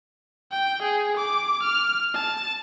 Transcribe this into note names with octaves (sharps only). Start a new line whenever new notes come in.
G5
G#4
D6
F6
A5